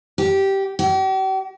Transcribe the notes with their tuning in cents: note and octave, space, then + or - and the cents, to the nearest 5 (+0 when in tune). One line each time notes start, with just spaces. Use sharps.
G4 -10
G4 -45